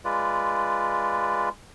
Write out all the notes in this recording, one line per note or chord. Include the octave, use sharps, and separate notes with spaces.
G#3 F4 B4 D5